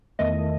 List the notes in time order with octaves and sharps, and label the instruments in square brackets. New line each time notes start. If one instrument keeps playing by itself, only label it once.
[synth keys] E2 D#3 A3 D#5